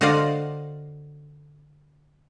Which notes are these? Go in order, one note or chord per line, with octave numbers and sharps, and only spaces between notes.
D3 F#4 C5 D5 D#5 F5